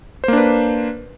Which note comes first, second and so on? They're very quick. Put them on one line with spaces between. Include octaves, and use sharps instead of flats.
C5 A#3 D4 B4